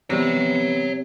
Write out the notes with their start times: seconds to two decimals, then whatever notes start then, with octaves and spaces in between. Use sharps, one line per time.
0.10 C3 E3 G3 B3 C#5 A#5